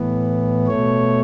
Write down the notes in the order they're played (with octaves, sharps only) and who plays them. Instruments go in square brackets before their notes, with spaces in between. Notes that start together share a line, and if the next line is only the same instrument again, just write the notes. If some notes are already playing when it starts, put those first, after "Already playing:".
Already playing: [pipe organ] A2 E3 B3
B2 A3 C#5